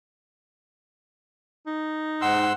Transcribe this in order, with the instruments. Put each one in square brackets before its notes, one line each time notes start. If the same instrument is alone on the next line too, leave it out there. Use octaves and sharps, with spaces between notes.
[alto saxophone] D#4
[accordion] G#2 C6 E6 [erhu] F#5